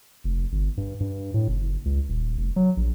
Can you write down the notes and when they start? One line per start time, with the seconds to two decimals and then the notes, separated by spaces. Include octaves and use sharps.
0.24 F1
0.52 G1
0.77 G2
1.00 G2
1.34 A2
1.48 F#1
1.85 C#2
2.08 D#1
2.37 F1
2.56 F#3
2.77 A#1